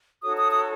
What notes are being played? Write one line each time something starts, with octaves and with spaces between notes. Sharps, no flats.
D#4 F#4 A4 C#5 D#6
D#6
D#6